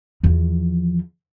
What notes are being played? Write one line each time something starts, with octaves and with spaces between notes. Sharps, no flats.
E2 F3